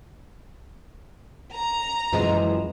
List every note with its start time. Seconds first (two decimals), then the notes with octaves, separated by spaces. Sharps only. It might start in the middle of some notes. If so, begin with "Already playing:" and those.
1.55 A#5
2.12 F#2 E3 F3 G#3